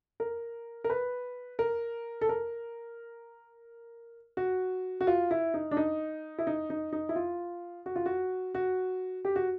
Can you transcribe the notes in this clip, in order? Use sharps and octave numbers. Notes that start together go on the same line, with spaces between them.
A#4
A#4
B4
A#4
A4
A#4
F#4
F#4
F4
E4
D#4
D4
D#4
E4
D#4
D#4
D#4
E4
F4
F#4
F4
F#4
F#4
G4
F#4